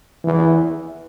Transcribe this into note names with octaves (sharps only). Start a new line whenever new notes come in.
E3